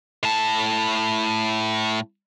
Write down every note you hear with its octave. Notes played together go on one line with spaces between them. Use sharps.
A2 A5